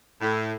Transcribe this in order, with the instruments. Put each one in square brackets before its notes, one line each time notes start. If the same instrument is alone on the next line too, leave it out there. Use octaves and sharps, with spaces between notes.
[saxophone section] A2